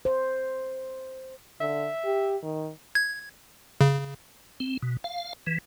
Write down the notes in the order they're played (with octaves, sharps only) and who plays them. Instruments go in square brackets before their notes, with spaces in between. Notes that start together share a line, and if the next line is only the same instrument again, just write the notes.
[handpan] C5
[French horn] D3 [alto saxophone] E5
[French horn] G4
D#3
[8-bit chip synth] G#6
C#3
[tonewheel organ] C4
B2
F5
E3